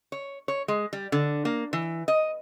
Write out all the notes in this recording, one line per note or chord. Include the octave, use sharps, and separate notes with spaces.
C#5
C#5
G#3
G3
D3
A#3
E3
D#5